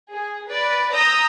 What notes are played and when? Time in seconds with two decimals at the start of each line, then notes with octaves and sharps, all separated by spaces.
0.11 G#4
0.46 B4 D5
0.94 A#5 D#6 E6 G6 A#6